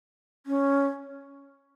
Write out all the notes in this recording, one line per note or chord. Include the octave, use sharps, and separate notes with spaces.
C#4